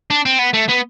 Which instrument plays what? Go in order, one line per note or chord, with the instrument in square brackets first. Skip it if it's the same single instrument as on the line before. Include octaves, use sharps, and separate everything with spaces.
[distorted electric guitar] D4
C4
B3
A3
B3